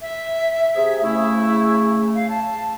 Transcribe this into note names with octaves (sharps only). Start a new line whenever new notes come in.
E5
C3 G#4
C#3 A3 E4
F5
A5